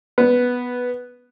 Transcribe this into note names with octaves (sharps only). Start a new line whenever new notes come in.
B3